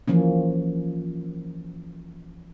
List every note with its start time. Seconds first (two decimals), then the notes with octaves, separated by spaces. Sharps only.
0.08 E3 F3 A#3 C#4